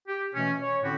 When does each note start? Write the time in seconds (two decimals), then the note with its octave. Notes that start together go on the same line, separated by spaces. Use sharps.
0.08 G4
0.34 B2 E3 A3 C#4
0.62 C#5
0.83 A2 D3 C4 C#4 F#4 G4